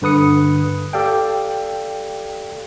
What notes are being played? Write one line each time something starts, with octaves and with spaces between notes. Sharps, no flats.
G2 D3 B4 D#6 C#7
G4 A4 D5 F5 G5